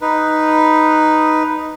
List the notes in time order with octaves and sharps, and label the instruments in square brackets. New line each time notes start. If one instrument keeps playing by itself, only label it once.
[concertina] D#4 B4